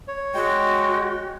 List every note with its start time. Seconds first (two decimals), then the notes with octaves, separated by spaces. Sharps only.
0.08 C#5
0.34 G#3 F#4 G5